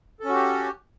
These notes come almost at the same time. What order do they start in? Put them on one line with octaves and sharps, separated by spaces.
A4 C#4 F#4 G4